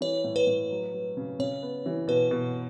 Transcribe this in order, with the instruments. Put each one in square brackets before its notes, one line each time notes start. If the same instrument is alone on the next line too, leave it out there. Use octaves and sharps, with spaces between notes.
[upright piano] E3 [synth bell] C#5
[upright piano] A2
[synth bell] B4
[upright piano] A2
F#3
F#3
C#3
[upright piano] C#3 [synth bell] C#5
[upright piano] B3
E3
[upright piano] B2 [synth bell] B4
[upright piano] B2